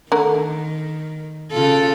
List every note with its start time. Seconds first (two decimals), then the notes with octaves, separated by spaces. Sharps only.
0.12 D3 D#3 A3 A#4
1.51 C#3 F4 A4